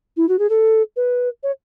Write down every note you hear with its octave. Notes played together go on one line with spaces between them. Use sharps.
E4
F#4
G#4
A4
B4
C#5